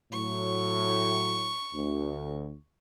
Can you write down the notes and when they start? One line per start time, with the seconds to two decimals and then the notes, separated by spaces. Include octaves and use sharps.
0.12 A2 F#3 C#6
1.73 D2